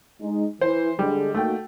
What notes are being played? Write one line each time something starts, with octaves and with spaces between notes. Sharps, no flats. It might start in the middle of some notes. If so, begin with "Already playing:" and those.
G#3 D#4
E3 C5
D3 G3 G#3
A3 A#3 D#4 F#4 G5